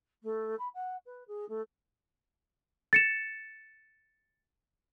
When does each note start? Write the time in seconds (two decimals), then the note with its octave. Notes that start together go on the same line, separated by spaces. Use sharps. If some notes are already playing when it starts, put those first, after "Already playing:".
0.23 A3
0.59 B5
0.74 F#5
1.06 B4
1.27 G#4
1.49 A3
2.93 A6 C#7 E7